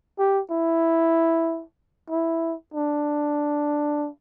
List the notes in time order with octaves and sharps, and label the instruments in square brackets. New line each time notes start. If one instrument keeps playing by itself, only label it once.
[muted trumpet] G4
E4
E4
D4